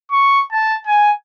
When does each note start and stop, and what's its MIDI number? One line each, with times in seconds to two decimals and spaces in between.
0.12 0.43 85
0.52 0.78 81
0.86 1.11 80